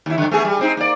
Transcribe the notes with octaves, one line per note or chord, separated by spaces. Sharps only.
D#2 E4
F#2 D3
A3 B3 G#4
G3
G#3 C4 D#4
A#3 D5